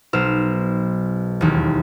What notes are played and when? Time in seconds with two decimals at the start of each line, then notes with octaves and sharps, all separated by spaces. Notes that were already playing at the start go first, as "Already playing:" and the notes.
0.13 B1 F#3 C5 E6 F6
1.41 E1 D#2